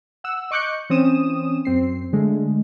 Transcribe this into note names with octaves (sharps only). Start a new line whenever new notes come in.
F#5 E6
D#5 C#6 D6 F#6 G6 C#7
E3 C4 C#4 D#6 E7
F#2 C4 C7
D3 G#3 A3